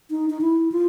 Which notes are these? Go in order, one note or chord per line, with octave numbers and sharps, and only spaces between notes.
D#4
D#4
E4
F4